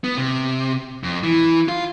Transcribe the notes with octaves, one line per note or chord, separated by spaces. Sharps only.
B3
C3
F2
E3
F4